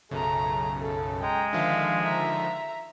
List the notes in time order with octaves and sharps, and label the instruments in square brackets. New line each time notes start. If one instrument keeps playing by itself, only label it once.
[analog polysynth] B1 F#2 C#3 [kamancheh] A3 A#5
[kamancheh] A4
[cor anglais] G#3 [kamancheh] G5 A#5
[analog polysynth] D3 D#3 F3 [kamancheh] E5 F5
[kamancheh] E5 A#5